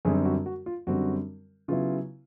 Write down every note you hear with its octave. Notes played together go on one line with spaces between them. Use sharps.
F#2 D3 G3 C4 G#4
F#4
F#4
F4
F#2 D3 G3 C4 F#4
C#3 F#3 B3 E4 F4